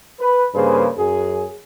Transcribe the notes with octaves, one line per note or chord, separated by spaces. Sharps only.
B4
G2 C#3 A#3 G#4 B4 C5
F#2 G#4